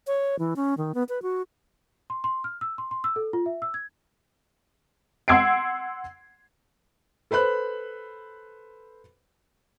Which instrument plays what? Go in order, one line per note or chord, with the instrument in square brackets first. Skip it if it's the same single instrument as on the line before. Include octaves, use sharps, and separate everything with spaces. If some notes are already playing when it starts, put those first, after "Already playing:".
[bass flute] C#5
E3
C#4
D#3
B3
B4
F#4
[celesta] C6
C6
F6
E6
C6
C6
E6
A4
F4
E5
E6
G#6
[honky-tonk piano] F#5 C6 E6 G#6 C7 D7
[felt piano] A4 B4 C5 B5 F#6